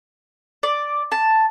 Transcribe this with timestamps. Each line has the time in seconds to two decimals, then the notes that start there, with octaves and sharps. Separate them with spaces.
0.63 D5
1.12 A5